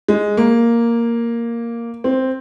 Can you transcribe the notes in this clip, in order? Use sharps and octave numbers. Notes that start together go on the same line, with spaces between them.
G#3
A#3
C4